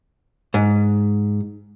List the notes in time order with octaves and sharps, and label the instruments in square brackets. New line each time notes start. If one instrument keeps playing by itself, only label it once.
[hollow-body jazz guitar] G#2